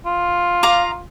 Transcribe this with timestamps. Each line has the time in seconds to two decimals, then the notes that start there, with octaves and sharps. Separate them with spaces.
0.06 F4
0.63 F5 A#5 D6